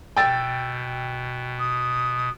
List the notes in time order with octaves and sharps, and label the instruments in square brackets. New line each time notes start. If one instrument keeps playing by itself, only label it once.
[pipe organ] B2 [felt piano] G5 E6 A6
[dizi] D#6